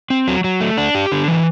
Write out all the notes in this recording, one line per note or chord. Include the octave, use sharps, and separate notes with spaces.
C4
F#3
F#3
A3
D4
G4
D3
E3